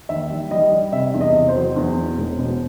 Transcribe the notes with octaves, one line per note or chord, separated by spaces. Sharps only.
D#2 E5
G3
G3 D#5
G3
C3 E5
E2
D#5
C3
C5
F#3
E2
B2
E1
B2